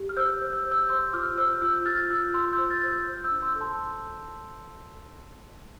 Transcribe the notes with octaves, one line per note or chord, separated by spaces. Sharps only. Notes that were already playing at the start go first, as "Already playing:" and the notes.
Already playing: G4
F6
C5 E6 G6
C5
E6 G6
C5
E6 G6
C5 C6 E6
F4 D6 F6
C5 E6 G6
F4 E6 G6
F4 F6 A6
F4 E6 G6
F4 C6 E6
E6 G6
C5
F6 A6
C5
E6 G6
C5
E6 G6
D4
C6 E6
A4
A5 C6